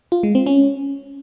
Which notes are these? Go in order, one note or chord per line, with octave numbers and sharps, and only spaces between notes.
F4
G#3
C4
C#4